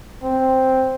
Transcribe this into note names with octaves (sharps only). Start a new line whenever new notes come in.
C4